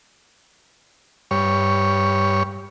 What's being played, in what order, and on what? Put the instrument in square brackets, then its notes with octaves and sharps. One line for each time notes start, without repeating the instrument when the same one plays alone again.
[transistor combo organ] G2 C#5